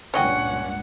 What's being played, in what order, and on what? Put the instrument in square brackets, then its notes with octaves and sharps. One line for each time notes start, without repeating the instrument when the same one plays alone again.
[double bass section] C#2 G2 A#2 [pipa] C#4 [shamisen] C#5 D#5 G5 [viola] F#5